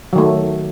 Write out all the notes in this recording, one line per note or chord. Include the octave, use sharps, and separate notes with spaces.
D#3 F#3 A3